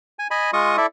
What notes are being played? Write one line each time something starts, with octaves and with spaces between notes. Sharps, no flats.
G#5
D#5 G#5 B5
G#3 F4 D#5 C#6 D#6
E4 A4 D5 E5